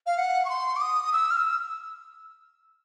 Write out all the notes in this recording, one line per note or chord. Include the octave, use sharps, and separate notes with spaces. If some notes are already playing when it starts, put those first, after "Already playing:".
F5
F#5
C#6
C6
D6
D#6
E6
F6
E6